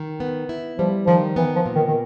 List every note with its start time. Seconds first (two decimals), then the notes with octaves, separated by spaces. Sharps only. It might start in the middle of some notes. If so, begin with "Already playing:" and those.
Already playing: D#3
0.20 B3
0.49 E4
0.78 F3 G3
1.07 D#3 F3
1.36 E3 B3
1.56 F3
1.66 A#2
1.76 D#3
1.88 D#3